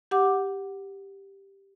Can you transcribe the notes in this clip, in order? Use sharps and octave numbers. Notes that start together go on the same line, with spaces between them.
G4 F#5 D6